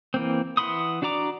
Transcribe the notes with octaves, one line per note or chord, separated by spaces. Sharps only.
E3 A#3 C4
E3 F#5 B5 C6 D#6
D4 F#4 D5 A#5 D6